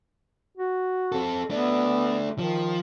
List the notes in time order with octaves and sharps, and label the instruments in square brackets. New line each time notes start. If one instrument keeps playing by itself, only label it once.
[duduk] F#4
[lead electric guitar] C4 A4
[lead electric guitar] A3 D4 [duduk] B3
[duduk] D#3 [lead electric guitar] F3